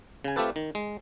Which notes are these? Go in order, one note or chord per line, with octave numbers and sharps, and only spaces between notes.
C#3 G#5
A3 C4 F4 G4 A4 B4
D#3
G#3